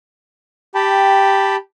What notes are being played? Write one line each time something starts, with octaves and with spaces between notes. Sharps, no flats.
G4 G5 A5 B5